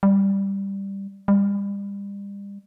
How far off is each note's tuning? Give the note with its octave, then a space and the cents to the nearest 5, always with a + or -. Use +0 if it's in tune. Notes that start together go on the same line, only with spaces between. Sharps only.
G3 +5
G3 +35